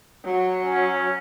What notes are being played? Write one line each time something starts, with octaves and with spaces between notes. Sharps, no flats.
F#3
C#4